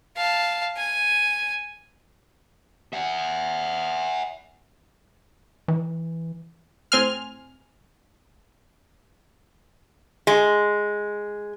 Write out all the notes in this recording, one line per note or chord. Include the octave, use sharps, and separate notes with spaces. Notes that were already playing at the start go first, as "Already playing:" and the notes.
F5 A5
G#5
E5 F#5
E3
A2 C4 G#5 C6 F6
G#3